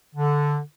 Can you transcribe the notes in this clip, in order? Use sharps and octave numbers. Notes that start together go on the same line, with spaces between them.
D3